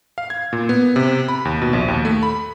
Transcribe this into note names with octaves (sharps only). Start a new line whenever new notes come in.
F5
G#6
A#2
B3
C3
B5
D#2
B2
A#1
D#2
A3
B5